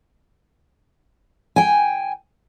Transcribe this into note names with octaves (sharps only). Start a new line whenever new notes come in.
G5 G#5